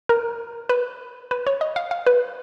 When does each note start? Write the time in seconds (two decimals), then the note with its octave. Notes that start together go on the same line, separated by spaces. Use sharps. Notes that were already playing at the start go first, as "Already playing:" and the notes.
0.09 A#4
0.69 B4
1.31 B4
1.47 C#5
1.61 D#5
1.76 F5
1.91 F5
2.06 B4